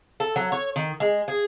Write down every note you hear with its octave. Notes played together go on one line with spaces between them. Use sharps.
A4
F#3
C#5
D#3
G#3
G#4